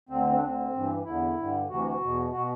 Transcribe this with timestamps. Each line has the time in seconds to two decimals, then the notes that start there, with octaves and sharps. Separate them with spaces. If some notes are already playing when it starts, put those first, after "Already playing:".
0.09 D2 D3 C4
0.25 C4
0.36 D4
0.41 D2 D3 C4
0.73 G2 E3
1.05 E2 D3 E4
1.37 G2 D3
1.69 D2 C3 E3 F#4
1.85 F#4
2.00 E2 B2
2.32 B2 F#4